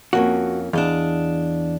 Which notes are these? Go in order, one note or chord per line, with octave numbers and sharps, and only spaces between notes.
F2 A#3 C#4 F#4
E2 D4 D#5 F5